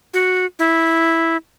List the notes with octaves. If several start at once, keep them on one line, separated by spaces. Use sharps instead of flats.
F#4
E4